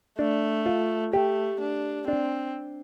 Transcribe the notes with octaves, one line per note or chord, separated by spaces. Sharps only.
A3 D4
F4
A3 G4
D4
C4 D4